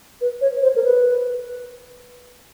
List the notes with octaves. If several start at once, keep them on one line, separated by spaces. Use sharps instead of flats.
B4
C#5
C5
A#4
B4